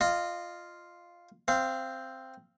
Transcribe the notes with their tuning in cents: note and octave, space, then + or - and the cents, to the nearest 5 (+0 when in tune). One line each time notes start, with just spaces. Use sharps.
F4 +0 D#5 -25
C4 +0 F5 -25